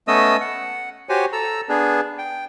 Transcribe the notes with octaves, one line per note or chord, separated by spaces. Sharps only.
A3 B3 C#4 D#5 D#6 E6
F#5
F#4 G4 C5 C#5 G#5
A4 A#5 E6
B3 D4 G#4
G5